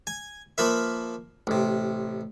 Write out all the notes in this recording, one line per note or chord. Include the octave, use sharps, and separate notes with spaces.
G#5
F3 A#3 B4 E5
A1 C3